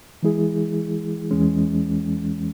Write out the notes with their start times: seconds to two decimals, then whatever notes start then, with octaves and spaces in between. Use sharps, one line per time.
0.23 E3 G#3 E4 G#4
1.31 E2 E3 G#3 C#4